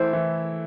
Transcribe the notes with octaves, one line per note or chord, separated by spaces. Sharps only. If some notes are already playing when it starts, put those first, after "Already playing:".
Already playing: E3 A3 E4 C5
E3